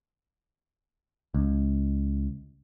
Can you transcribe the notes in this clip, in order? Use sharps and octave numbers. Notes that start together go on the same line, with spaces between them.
C#2